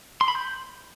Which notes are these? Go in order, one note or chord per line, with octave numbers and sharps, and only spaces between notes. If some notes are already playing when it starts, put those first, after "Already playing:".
C6
B5
G6